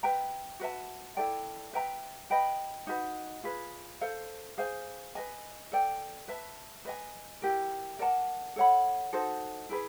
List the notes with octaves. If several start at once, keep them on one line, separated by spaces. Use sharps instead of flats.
B4 E5 G5 A#5
F#4 B4 E5 A5
E4 A4 D5 G5
B4 E5 G5 A#5
B4 D#5 G5 B5
D#4 F#4 B4
F4 G#4 B4
A4 C5 F5
G#4 C5 F5 G#5
B4 D#5 G#5
A4 D5 G5
B4 E5 A5
B4 D#5 G#5
E4 G4 A#4
A#4 D5 F#5 A5
A4 C#5 F#5 B5
D#4 F#4 A4 C5
E4 G#4 B4